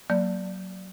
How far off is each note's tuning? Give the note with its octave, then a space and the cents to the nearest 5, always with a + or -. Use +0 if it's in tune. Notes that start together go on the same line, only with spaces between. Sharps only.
F#3 +10 A#3 +0 D5 +0